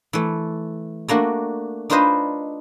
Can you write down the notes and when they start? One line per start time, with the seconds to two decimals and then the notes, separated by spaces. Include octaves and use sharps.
0.13 E3 A3
1.08 A3 A#3 D4 F#4
1.90 D4 D#4 F4 B4 C5 D#5